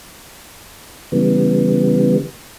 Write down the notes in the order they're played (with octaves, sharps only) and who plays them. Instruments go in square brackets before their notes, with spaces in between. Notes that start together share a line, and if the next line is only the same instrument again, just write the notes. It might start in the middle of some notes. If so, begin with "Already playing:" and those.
[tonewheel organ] C#3 E3 G3 B3